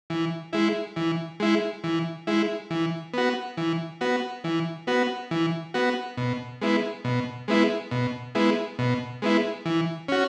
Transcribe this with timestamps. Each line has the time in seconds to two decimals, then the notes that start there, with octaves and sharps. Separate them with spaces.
0.10 E3
0.53 G#3 E4
0.96 E3
1.40 G#3 E4
1.84 E3
2.27 G#3 E4
2.70 E3
3.14 B3 F#4
3.57 E3
4.01 B3 F#4
4.44 E3
4.87 B3 F#4
5.31 E3
5.74 B3 F#4
6.17 B2
6.61 G#3 B3 E4
7.05 B2
7.48 G#3 B3 E4
7.91 B2
8.35 G#3 B3 E4
8.79 B2
9.22 G#3 B3 E4
9.65 E3
10.08 C#4 F#4